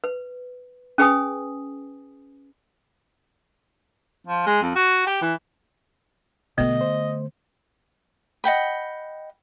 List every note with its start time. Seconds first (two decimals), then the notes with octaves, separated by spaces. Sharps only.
0.04 B4
0.98 C#4 G#4 B4 G#5 D#6
4.27 F3
4.47 G#3
4.62 F2
4.76 F#4
5.07 G4
5.22 E3
6.58 B2 D3 A3 B3 D#5
6.81 C5
8.44 D#5 F#5 G5 B5